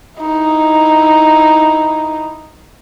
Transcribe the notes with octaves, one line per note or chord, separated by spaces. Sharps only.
D#4 E4